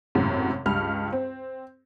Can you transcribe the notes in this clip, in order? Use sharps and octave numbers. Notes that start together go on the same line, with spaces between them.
G#1 F#2 A2 C3
C#2 G2 G3 F6
C4